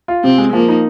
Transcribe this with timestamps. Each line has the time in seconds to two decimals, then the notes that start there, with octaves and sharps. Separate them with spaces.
0.08 F4
0.24 C3 C4
0.38 G#3
0.53 F3 A#3
0.68 D#4